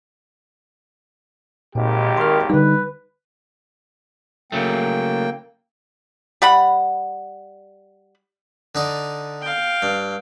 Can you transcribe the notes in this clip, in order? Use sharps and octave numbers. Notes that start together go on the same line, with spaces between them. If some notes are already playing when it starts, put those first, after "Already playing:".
G#1 D#2 A#2 G4
D#3 C6 F6
D3 G3 D#4 B4
C#3 F#3 A3 A#3 G5
G3 F#5 B5
D3 D#4 D5
F5 G5
G2